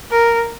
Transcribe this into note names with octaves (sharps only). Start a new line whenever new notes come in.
A#4